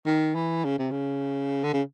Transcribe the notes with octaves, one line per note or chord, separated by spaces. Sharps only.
D#3
E3
C#3
C3
C#3
D3
C#3